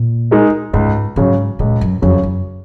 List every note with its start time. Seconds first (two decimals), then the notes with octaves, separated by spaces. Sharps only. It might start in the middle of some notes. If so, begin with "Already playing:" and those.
Already playing: A#2
0.31 G#3 D#4 A#4 D#5
0.73 C#2 G#2
1.16 G#2 C#3 F#3
1.59 C#2 A#2
1.81 F#2
2.02 F2 C#3 F#3
2.23 F#2